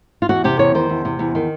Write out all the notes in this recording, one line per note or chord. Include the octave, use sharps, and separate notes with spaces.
F4
E2 F#4
C3 G4
E2 C#5
D#3 C5
E2
C3
E2
D#3